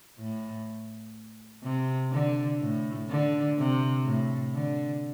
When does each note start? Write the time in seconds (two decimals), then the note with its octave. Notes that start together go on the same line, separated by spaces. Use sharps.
0.19 A2
1.63 C3
2.12 D3
2.61 A2
3.09 D3
3.58 C3
4.05 A2
4.54 D3